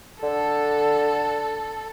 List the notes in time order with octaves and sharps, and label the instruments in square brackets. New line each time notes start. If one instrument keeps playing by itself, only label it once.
[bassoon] D3 [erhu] A4